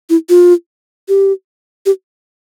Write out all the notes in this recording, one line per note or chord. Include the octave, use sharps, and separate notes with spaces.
E4
F4
G4
G4